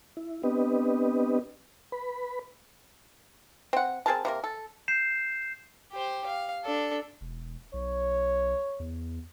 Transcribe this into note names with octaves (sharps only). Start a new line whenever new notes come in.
E4
B3 C4 D4 G4 B4 D#5
B4 B5
C4 F#5
C4 G#4 A#4 A5
C3 A#3 A#4
A4
G6 C7 E7
G4 C5
F5
D4 A4
E1
B1 C#5
E2